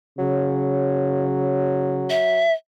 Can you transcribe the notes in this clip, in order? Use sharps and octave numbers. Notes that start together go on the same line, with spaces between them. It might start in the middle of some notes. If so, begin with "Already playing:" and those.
C#3 F#3
E5